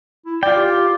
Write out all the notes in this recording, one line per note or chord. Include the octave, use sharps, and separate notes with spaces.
E4
F4 D5 G5
G4